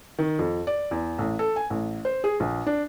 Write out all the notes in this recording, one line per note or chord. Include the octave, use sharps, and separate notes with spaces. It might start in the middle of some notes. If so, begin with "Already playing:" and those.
D#3
F2
D5
E2
A1
A4
G#5
A1
C5
G#4
A#1
D4